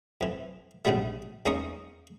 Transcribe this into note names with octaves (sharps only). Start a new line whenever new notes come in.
F2 E3
A#1 G#2 C#3 F#3 G3 A3
E2 A#3 C#4 D#4 D#5 C#6